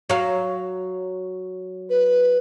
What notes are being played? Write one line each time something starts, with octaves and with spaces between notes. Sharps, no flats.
F#3 F5
B4